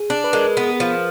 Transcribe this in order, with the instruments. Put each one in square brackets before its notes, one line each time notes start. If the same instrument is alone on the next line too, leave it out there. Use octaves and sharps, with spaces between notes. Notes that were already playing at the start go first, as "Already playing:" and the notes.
Already playing: [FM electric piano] G#4
[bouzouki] D4
[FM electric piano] B4
[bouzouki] G#3 [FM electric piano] A#4
[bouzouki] B3
F3